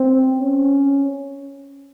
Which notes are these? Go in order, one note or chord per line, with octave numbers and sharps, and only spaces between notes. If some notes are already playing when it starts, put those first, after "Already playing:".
Already playing: C4
C#4